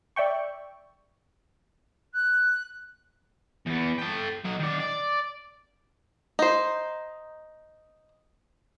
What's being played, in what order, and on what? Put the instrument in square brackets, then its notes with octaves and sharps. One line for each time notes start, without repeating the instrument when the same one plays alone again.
[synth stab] D5 E5 G5 C#6
[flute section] F#6
[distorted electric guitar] E2 B3
A4 G5
F#3 D#5
D#3 D5
D5
[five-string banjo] D#4 C5